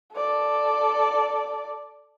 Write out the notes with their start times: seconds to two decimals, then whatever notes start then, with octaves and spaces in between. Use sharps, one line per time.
0.14 A4 D5